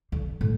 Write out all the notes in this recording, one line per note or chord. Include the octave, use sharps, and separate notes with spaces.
D3
A2